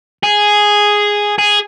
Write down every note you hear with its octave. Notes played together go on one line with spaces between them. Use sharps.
G#4
G#4